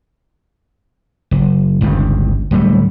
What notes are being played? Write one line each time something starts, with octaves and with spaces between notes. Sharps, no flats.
F#1
G1 C#2 G2
D1 G3 A3